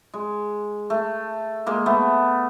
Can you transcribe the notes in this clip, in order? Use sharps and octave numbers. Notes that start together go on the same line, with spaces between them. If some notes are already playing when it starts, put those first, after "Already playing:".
G#3
A3
G#3 A#3
A3 B3